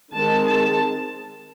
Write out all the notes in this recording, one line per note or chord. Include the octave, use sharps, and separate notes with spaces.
D#3 G#3 C4 A5
A5